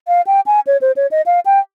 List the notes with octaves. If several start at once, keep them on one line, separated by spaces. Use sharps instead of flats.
F5
G5
G#5
C#5
C5
C#5
D#5
F5
G5